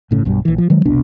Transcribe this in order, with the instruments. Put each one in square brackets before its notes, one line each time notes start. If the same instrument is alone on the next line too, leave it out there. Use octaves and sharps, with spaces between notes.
[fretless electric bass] G1 A2 C#3
B1 G2 B2 G3
A#1 E3
F3
D#3 F#3 G#3
F1 C2 B2 D4